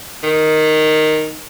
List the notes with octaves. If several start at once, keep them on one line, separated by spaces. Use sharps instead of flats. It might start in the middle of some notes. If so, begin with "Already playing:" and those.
D#3